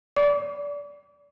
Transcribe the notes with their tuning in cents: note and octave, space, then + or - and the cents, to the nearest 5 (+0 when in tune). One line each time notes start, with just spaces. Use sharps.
D5 -20 D6 -35